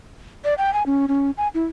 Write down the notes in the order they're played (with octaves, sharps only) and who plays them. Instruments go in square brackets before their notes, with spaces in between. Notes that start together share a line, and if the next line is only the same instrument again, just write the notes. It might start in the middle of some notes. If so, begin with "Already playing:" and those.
[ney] D5
G5
G#5
C#4
C#4
G#5
E4